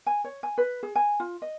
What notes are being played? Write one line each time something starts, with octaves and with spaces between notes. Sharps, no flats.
G#5
C#5
G#5
B4
G#4
G#5
F4
D#5